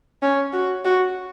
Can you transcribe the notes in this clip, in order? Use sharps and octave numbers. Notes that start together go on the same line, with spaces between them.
C#4
F#4
F#4